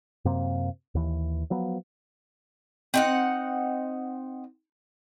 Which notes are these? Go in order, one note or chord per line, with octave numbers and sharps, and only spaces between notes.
F#2 C3 A#3 C4
D#2 E3
F3 F#3 B3
C4 D#4 F#5